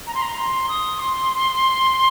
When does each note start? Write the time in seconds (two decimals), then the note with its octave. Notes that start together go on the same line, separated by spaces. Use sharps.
0.07 A#5
0.15 C6
0.22 A#5
0.38 C6
0.69 D#6
0.99 C6